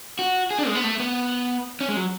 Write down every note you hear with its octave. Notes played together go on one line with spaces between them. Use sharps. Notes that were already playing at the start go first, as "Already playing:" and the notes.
F#4
G#4
D4
G#3
B3
A3
B3
C#4
G#3
F#3